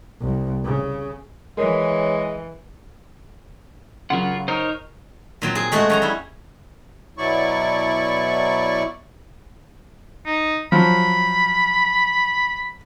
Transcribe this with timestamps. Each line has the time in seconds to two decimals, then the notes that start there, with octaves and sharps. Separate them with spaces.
0.21 C2
0.64 C#3
1.57 E3 G#3 A#4 C#5
4.10 C#3 F#3 F4 A#4 F#5
4.48 D#4 A#4 C5 C#5
5.42 A#2 F#3 C4
5.55 G#4
5.72 G#3 A3 F#4 G#4
5.90 F#2 C#5 A#5
6.02 G3 E4
7.18 B2 F#3 E4 D5 C#6
10.26 D#4
10.72 F3 F#3 B5